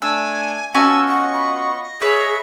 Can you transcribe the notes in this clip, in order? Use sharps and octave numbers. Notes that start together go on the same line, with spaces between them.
A3 D4 G#5 E6
B3 C#4 F4 F#4 D#5 G#5 A5 E6
F#5 C#6
B5
D#5
G#4 B4 C#5 E5